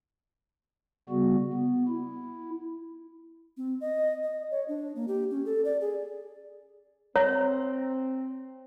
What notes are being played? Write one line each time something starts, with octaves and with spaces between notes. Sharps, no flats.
C#3 G3 B3 F#4
B3
E4
C4
D#5
D#5
C#5
D4
A#3
G4
C#4
A4
D5
G#4
C4 C#5 A#5